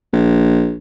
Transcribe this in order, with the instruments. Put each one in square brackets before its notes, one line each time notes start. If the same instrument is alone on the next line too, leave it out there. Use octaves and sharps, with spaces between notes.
[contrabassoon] A#1